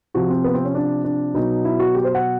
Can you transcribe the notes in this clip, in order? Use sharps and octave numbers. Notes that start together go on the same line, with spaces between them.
C3 F3 F#4
C4
B3
C4
C#4
D4
D4
B2 F#3 D#4
E4
F#4
G4
C5
F#5